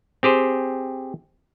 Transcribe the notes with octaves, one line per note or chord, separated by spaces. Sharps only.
C4 G4 G#4 C5